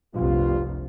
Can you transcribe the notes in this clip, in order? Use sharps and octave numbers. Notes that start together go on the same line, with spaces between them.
F1 C2 G2 F4